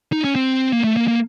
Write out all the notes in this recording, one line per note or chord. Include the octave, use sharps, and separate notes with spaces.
D#4
C#4
C4
A#3
A3
A#3
A#3